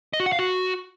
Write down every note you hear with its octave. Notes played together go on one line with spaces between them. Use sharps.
D#5
F#4
F#5
F5
F#4